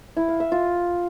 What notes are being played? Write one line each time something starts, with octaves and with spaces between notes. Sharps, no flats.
E4
F5
E5
F4